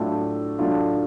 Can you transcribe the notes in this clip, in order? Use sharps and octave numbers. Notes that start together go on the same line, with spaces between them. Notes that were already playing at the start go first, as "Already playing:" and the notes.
Already playing: A2 F#3 A3 D4 F4
A2 F#3 A3 D4 F4